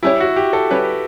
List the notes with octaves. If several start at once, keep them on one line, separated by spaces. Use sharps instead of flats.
G3 C#4 E4 G4 C#5
F#4
G4
A4
G3 C#4 G4 B4 C#5